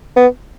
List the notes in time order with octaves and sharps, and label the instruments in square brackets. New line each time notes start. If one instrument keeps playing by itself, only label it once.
[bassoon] B3